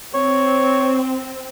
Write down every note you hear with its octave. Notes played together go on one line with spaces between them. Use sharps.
C4 C#5